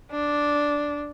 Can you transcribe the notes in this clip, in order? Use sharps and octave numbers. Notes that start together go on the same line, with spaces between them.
D4